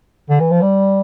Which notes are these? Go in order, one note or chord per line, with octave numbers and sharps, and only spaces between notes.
D3
E3
F3
G3